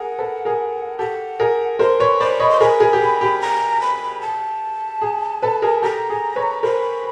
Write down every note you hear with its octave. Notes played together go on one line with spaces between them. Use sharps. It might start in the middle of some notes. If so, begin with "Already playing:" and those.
Already playing: G#4 A#4 F#5
A4 B4
G#4 A#4
G4 A4 F#5
G#4 A#4
A#4 C5 C6
B4 C#5
C5 D5 B5
C#5 D#5
C6
G#4 A#4 B5
G#4 A#4
G4
G#4
G4
A#5
B5
A5
G#4
A4 B4
G#4 A#4
G4 A4 A#5
G#4
B4 C#5
A#4 C5 B5